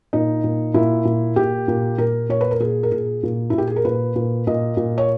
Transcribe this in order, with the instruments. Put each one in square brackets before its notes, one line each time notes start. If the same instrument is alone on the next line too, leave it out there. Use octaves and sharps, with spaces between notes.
[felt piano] A#2 D#4
A#2
A#2 E4
A#2
A#2 G4
A#2
A#2 A#4
A#2 C#5
B4
A#4
A#2 G#4
A#4
A#2 G#4
A#2
A#2 E4
G4
G#4
A#4
A#2 B4
A#2
A#2 D#5
A#2
C#5